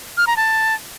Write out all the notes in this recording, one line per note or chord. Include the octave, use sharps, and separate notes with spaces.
F6
A#5
A5